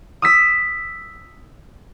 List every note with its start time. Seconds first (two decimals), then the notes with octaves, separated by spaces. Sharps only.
0.22 D#6 E6 B6